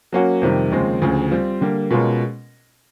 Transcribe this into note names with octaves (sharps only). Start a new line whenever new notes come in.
F#3 A#3 C#4 F#4
F2 C3 D#3 G3
D#2 C#3 F3 G#3 C4
D2 C#3 F3
G3 C4 F4
D3 G3 A#3
B2 G#3 C#4 F4 A#4